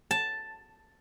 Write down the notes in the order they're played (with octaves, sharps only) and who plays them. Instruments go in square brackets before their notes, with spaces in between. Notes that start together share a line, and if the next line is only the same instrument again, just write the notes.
[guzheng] A5